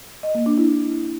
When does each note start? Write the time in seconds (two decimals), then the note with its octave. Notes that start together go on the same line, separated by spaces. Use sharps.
0.23 D#5
0.35 A#3
0.46 D4
0.58 E4